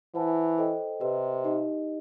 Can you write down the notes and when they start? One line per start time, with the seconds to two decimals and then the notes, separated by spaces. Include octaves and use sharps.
0.15 E3 C5 F#5 A5
0.58 A4 C5 D#5 G5
1.01 C3 G4 B4 D#5
1.44 D#4 G4 D#5